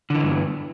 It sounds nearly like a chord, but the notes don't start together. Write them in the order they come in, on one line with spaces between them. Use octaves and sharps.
D3 E3 E2 G2